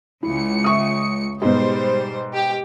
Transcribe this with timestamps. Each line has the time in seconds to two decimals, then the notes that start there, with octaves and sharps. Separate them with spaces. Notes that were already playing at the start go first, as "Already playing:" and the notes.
0.23 C#2 E4 C#7
0.64 E5 C#6 D#6
1.42 G#2 B2 G3 C5
2.34 G4